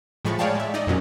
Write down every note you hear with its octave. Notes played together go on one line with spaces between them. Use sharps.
A2 F3 G#3 B5 C#6 A6
G#4 C#5 D5 F5 G5 A5
G#3 E5
D#4 D5 D#5
F2 A#2 F#3 C#4